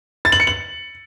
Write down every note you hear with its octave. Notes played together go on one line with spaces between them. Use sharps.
A6
F#7
C#7
F#7